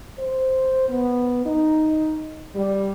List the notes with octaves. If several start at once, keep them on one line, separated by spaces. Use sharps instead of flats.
C5
B3
D#4
G3